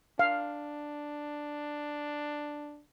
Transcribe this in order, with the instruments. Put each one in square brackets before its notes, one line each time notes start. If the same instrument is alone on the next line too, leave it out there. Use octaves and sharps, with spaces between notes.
[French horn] D4 [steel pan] F5